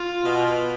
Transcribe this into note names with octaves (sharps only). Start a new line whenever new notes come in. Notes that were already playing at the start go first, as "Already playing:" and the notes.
Already playing: F4
B2